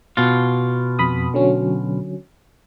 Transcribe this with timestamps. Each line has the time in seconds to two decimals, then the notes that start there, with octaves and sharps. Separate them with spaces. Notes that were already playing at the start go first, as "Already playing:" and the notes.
0.17 B2 F4
0.99 F2 B5 D#6
1.34 D3 F#3 C#4